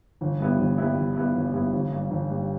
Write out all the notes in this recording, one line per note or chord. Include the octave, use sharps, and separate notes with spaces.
G1
G2 G3 B3 E4
G1
G2 G3 B3 E4
G1
G2 G3 B3 E4
G1
G2 G3 B3 E4
G1
G2 G3
G1
G2 G3